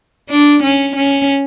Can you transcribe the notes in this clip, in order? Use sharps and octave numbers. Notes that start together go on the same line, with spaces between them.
D4
C#4
C#4